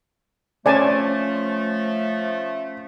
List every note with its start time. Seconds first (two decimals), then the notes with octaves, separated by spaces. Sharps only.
0.66 F3 A3 C#4 C5 D5 G#5 A5